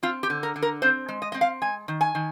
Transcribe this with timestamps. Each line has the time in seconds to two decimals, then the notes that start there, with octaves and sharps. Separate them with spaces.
0.03 C4 F4
0.23 G4
0.30 D3
0.43 A#4
0.56 D3
0.62 A#4
0.82 C4 C5
1.09 G#3
1.22 D#5
1.32 C4 D#5
1.41 F5
1.62 G#3 G#5
1.88 D#3
2.01 G#5
2.15 D#3